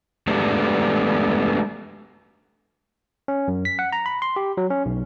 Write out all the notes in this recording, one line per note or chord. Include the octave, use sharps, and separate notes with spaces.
G#3 A3 B3 D4 G4 C5
C#4
F#2
B6
F#5
A#5
B5
C6
G4
F#3
C#4
B1